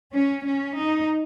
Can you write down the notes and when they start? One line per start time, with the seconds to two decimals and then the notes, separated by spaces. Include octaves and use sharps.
0.14 C#4
0.46 C#4
0.78 D#4